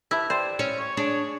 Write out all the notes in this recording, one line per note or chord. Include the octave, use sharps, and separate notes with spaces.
E4 G4 B4 A5
C5 D5 G5 E6
C#4
C#5
D4 G#4